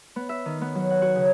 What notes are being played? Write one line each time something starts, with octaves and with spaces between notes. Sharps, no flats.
B3
E5
D#3
B3
F#3
F#5
F#4
C#3